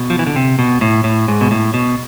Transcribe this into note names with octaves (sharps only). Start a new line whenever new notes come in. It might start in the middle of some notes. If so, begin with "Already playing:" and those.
Already playing: B2
F3
E3
D3
C3
B2
A2
A2
G#2
B2
A2
B2